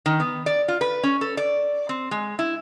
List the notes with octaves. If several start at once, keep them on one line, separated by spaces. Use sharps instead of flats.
D#3
B3
D5
F4
B4
C#4
A4
D5
C4
G#3
E4